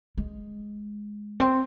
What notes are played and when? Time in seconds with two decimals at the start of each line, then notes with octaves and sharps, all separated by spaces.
0.18 G#3
1.40 C4